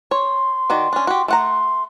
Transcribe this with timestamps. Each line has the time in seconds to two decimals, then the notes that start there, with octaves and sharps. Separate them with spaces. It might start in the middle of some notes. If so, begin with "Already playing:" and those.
0.11 C#5 C6
0.70 D#3 F#4 D5
0.93 C#4 D4
1.07 F#4 G4
1.28 A3 F#5 A#5 C6